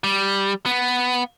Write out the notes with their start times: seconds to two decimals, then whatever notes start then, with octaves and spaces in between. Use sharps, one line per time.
0.04 G3
0.66 B3